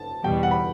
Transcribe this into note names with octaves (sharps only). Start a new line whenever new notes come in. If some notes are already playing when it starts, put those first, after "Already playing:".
Already playing: A5
E2 B2 G3 G5
F#5
B5